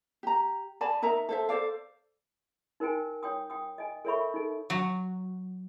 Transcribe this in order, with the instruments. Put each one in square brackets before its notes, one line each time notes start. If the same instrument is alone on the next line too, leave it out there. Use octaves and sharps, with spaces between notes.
[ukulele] G4 A#5
D5 G#5 A5 B5
D#4 A#4 E5 A#5
A4 C5 E5
A4 C5 D5 F5
[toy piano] D#4 A#4 C5 G5 G#5
C#5 G5 D#6
G5 D#6
D#5 G#5
A4 A#4 C#5 E5 B5 C#6
D#4 A4
[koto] F#3